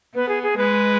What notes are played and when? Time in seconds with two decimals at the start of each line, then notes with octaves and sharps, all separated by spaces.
0.15 B3 B4
0.29 G#4
0.43 G#4
0.57 G#3 B4